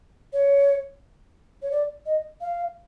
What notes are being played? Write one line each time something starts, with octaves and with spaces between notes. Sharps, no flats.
C#5
C#5
D5
D#5
F5